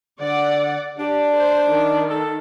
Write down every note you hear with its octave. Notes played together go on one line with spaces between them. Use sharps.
D3 D5 F#5
D4 G4
C5
D#3
A4